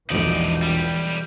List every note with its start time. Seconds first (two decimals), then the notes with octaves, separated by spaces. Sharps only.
0.10 E1 A#1 E3 D#4 D5
0.62 B1 G3